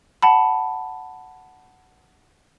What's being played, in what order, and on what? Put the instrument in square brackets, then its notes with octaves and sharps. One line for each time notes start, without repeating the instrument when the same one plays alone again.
[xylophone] F#5 A5 B5